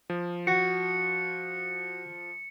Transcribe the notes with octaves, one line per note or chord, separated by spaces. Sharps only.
F3
F#4 C#7